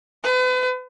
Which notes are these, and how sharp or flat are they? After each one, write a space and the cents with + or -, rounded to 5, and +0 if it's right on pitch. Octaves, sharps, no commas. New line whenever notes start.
B4 +40